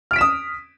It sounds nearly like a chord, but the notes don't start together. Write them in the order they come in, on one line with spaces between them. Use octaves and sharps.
F6 D7 B6 E7 D#6